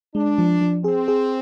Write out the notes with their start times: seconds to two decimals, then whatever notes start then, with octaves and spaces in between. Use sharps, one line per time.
0.15 G#3 D4
0.38 F3
0.61 F3
0.84 C4 G#4
1.08 G#4